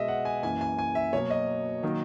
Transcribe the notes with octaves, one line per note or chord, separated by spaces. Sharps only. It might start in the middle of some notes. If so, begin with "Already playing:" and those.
Already playing: B2 G#3 D#5 E5
F#5
G#5
F#2 E3 A#3 G#5
G#5
G#5
E5
B2 F#3 A#3 C#5
D#5
D#3 F#3 A#3